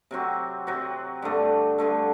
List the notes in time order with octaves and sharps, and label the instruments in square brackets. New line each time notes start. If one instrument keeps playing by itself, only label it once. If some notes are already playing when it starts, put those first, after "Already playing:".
[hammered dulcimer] C3 F#3 C4 F#4
C3 F#3 C4 F#4
G2 D3 A3
G2 D3 A3